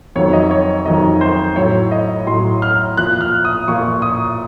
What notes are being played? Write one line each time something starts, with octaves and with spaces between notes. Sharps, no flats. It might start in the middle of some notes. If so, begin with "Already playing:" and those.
F2 D#3 F#3 C#5
D#5
C#5
F2 D#3 F#3 D#5
C5
A2 F#3 C#5
D#5
A2 F#3 C6
F6
A#2 F3 F#6
F6
D#6
A#2 F3 C#6
D#6